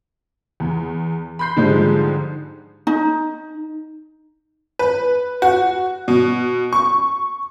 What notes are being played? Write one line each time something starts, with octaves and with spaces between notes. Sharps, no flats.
E2
B5 C6 G6 C7
G#2 D3 F3 G3 G#3
D#4
B4
F#4
B2
C#6